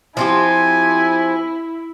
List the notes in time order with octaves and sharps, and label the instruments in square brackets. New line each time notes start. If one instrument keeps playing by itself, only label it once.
[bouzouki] F3 C4 G4 [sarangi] E4 [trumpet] G#5